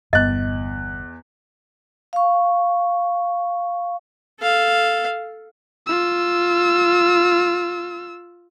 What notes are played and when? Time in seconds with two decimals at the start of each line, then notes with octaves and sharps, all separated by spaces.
0.13 G1 E2 G2 D#5 F#6
2.13 F5 C#6
4.40 A4 F5
5.87 F4 E6